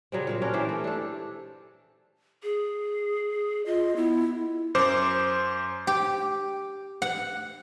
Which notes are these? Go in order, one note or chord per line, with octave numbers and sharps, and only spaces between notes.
C#3 F#3 G3 C4
A#2 C4 F5
C#4 D4 F4 A#4
E3 G4 C5 D5
A3
D4 A4
G#4
F4 D#5
B3 E4
F#2 C5 D6
G4
F#5